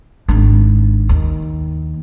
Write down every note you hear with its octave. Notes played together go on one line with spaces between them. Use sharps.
G#1 D4
D#2